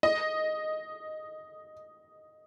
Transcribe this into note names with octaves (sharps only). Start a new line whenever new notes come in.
D#5